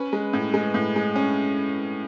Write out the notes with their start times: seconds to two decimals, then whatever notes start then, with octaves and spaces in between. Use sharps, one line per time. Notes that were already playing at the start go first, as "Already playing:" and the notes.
Already playing: C#4 B4
0.13 G#3
0.33 A2
0.54 G#3
0.74 A2
0.96 G#3
1.16 C#4